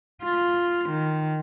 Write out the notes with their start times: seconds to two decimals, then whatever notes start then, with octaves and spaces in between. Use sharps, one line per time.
0.24 F4
0.89 D#3